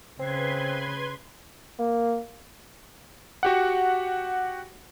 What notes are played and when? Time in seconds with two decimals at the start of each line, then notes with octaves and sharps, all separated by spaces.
0.20 C#3 C4 B4 C6 G#6
1.79 A#3
3.43 F#4 G4 F#5